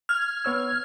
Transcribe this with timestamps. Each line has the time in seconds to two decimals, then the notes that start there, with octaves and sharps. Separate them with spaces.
0.09 F6 G#6
0.45 B3 C#5 E6